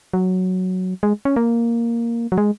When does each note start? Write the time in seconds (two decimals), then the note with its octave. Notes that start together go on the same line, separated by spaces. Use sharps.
0.13 F#3
1.03 G#3
1.25 C#4
1.36 A#3
2.32 F#3
2.38 G#3